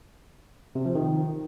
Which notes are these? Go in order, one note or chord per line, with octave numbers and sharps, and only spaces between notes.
C3
F3
D#3